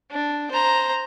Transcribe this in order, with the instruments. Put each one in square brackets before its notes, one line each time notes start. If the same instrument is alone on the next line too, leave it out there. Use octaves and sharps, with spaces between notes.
[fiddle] D4
C5 A#5